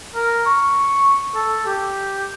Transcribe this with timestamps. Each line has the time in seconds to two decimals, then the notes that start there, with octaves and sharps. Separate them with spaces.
0.15 A#4
0.47 C#6
1.36 A4
1.66 G4